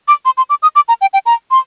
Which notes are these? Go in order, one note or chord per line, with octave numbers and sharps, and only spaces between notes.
D6
C6
C6
D6
D#6
D6
A#5
G5
G5
A#5
C6